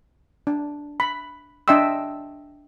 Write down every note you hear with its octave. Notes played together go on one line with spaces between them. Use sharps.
D4
B5
D4 D#5 E5 G5 C6 E6